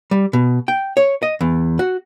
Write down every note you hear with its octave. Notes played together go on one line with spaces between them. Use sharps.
G3
B2
G5
C#5
D#5
E2
F#4